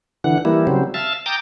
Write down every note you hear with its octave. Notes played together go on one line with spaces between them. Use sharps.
D3 E3 F#5
E3 G3 A#3 E4
C#3 F#3 G3 C4
E5 F5 A5
G5 A#5 D6 D#6 A6